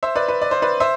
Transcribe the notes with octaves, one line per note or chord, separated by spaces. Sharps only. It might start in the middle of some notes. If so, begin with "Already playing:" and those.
C5 E5
B4 D5
B4
D5
C5
B4 D5
C5 E5